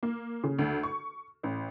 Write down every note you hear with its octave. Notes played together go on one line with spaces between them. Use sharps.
A#3
C#3
D2
C#6
A1